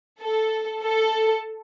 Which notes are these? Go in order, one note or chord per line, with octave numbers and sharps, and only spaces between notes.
A4
A4